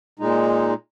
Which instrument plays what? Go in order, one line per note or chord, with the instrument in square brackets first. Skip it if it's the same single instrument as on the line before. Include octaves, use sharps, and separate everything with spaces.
[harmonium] A#2 G#3 D#4